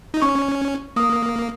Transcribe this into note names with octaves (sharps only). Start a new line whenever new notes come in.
D#4
C#4 C#6
A#3 D#6